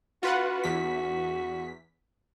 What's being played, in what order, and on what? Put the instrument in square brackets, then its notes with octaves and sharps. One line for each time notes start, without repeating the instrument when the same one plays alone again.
[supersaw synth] F4 B4 F#5 [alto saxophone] F#4
[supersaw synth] E2 B6